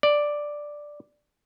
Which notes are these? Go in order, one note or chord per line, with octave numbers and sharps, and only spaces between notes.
D5